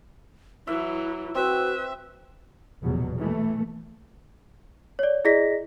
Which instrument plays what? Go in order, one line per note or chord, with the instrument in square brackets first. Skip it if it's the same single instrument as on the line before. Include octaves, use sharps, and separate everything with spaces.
[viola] E3 F#3 [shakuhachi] E4 [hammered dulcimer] E5
[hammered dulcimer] C4 [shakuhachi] F#4 [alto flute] B4 [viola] E5
[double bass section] F1 A#1 E2 B2 F#3
E3 A3
[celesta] C#5 D5
E4 G#4 D5 D#5 A#6 B6